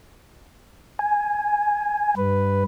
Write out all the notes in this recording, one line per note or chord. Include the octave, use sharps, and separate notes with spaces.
G#5
G2 B4